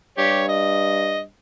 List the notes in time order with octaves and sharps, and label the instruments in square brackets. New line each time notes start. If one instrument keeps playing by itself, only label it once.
[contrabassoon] G2 [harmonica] G4 C#5
[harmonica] D#5